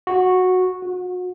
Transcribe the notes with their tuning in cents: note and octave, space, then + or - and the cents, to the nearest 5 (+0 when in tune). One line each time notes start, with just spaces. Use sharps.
F#4 -10
F#4 -35